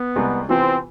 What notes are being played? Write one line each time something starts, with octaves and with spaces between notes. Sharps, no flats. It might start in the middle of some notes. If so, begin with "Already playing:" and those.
Already playing: B3
C2 C3 G#3 C4 G#4
C3 E3 B3 C4 F4 B4